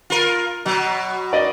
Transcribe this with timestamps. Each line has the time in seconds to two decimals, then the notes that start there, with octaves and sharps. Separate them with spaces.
0.10 F4 A#4
0.65 B2 F#3
1.33 D5 D#5